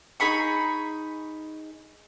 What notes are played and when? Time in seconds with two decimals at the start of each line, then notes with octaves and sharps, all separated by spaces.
0.20 D#4 G#4 B5 C#6